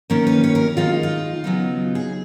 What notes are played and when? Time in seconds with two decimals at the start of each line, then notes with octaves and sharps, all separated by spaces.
0.10 D#3 A#3 C#4 A#4
0.27 B4
0.44 C#5
0.55 A#4
0.77 D#3 G#3 D#4 F4
1.03 F4
1.44 C#3 F#3 B3 D#4
1.95 G#4